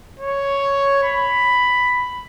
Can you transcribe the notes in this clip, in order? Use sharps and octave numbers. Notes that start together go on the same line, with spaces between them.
C#5
B5